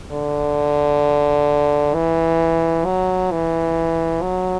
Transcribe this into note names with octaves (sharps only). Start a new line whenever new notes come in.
D3
E3
F#3
E3
F#3